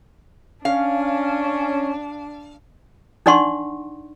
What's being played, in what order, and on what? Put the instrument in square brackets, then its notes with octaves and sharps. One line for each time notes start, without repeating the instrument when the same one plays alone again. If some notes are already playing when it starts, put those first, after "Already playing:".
[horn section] C#4 [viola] D4 [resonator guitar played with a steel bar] F5
[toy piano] D4 D#4 D5 F#5 C6 C#6